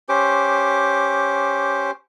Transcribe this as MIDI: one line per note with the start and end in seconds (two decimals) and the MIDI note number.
0.09 1.91 61
0.09 1.91 67
0.09 1.91 72
0.09 1.91 86